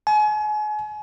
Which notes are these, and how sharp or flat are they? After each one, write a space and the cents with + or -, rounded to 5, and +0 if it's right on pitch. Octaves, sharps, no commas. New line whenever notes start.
G#5 +35